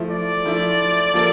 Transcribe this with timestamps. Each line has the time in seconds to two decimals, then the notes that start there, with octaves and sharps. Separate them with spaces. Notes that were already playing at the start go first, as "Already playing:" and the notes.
Already playing: F3 A3 E4
0.11 D5
0.45 F3 A3 E4
1.14 F3 A#3 F4 A4